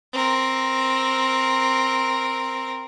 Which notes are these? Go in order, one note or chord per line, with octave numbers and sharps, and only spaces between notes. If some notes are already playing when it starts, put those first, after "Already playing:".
C4 A#4